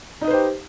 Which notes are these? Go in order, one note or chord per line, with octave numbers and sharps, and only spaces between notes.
D#4 G4 B4 C5 D#5